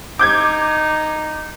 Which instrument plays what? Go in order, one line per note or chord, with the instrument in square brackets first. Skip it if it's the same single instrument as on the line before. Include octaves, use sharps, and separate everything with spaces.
[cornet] D#4 [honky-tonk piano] D6 G6 G#6